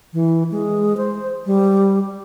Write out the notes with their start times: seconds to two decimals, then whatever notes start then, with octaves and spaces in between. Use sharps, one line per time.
0.13 E3
0.51 G#3
0.97 C5
1.46 G3